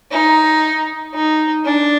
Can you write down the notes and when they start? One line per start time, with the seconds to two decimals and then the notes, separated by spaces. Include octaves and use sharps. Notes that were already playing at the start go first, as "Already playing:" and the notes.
0.11 D#4
1.14 D#4
1.65 D4